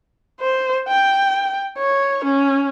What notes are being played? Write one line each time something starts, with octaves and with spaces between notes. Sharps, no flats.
C5
G5
C#5
C#4